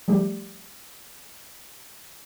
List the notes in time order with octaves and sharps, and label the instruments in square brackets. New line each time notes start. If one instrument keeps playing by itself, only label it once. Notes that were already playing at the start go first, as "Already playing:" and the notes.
[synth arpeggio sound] F3 G3 A3 G4